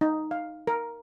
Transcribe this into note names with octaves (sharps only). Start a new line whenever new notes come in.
D#4
F5
A#4